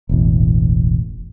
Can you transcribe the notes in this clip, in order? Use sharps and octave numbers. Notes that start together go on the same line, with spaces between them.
E1 A1